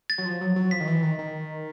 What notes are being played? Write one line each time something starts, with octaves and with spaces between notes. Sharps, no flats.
A6
F#3
F3
F#3
F#3
F3 B6
D#3
E3
D#3
D#3